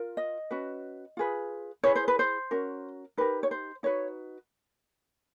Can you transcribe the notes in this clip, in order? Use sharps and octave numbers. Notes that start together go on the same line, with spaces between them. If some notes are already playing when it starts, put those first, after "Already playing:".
Already playing: F4 A#4
D#5
C#4 F#4 B4
F4 G#4 B4
E4 G#4 B4 C#5
C5
B4
C5
C#4 F#4 A#4
D#4 G4 A#4 B4
C#5
C5
D#4 F#4 B4 C#5